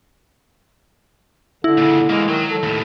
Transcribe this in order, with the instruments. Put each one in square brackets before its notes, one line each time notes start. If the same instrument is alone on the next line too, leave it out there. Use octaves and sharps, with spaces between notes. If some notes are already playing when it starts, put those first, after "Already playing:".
[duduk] D3 [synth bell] E4
[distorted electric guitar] A#2 C#3
[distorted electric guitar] E3 A#3 [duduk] G#3
[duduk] D#3 [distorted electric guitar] F#3
[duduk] A4
[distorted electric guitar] D#2 A2